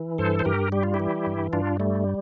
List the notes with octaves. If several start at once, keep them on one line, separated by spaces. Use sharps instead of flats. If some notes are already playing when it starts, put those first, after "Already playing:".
Already playing: E3
G2 A4 C5
C5
G2 G4 A#4
G3 G4
F4
E4 G4
E3
G2
G2 D4 F4
G3 A3